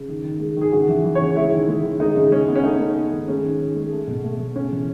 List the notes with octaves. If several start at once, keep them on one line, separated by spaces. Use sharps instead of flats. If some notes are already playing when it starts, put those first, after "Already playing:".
Already playing: C#3
D#3
D#3
G#3
D#3 G#4
C#3 F#4
E3
E3
C#3 C#5
G#3 E4
D#3
G#3
D#3
G#3 D#4
C#3
G#3 C#4
B3
C#4
A3 D#4
A3
A3
D#3
G#3 C#4
D#3
D#3
G#3
A3
B2
A3
B2
C#3 C#4
E3